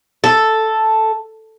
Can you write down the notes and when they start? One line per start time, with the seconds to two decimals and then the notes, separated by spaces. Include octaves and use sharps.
0.24 A4